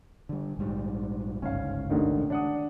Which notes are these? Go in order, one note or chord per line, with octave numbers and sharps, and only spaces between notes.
D3 G3
A#1 G#2 G3
G1 C#2 G#2 C#4 F5
A1 D3 D#3
D4 F#5 D#6